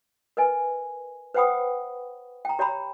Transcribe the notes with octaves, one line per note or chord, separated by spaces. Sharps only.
A#4 B4 D#5 G#5
B4 C5 F#5 G5 B5 D#6
G5 A#5
G4 C#5 G5 A#5 B5